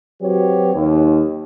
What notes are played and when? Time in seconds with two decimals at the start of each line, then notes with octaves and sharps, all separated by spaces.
0.21 F#3 C4 F#4 G4 B4 C#5
0.75 D#2